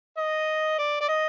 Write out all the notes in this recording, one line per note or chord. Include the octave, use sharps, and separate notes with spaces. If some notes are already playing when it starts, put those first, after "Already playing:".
D#5
D5
D5
D#5